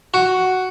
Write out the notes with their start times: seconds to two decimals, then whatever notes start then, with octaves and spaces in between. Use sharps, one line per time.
0.14 F#4